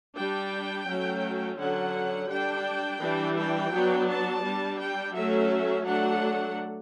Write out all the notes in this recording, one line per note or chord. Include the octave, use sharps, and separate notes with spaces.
G3 D4 G5
F#3 A3 C#4
D3 F#3 C#4 F#5
G3 D4 G5
E3 G3 D4
G5
F#3 B3 D4
A5
G3 D4
G5
F#3 A3 C#4 E5
F#3 A3 D4 F#5